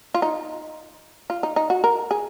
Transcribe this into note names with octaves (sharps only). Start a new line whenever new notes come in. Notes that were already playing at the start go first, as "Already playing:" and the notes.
F4
D#4
F4
D#4
D#4
F#4
A#4
G#4